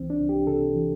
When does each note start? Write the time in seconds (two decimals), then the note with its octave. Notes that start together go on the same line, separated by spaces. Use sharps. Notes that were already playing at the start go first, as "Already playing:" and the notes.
Already playing: C2 C3 E3 C4
0.10 D4
0.20 C2
0.29 G4
0.47 C3 A4
0.75 E3